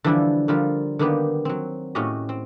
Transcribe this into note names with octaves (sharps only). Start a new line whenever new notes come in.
D3 E3 F3 G3 D4 E4
D3 F3 G3 F4 A#4
D3 D#3 A#3 B3 G4 B4
F#3 C4
A2 C#4 F#4 G4 D#5
C4